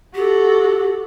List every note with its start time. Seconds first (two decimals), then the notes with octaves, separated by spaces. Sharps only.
0.15 F#4 G4 A4